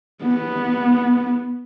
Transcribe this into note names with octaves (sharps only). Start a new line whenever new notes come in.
B3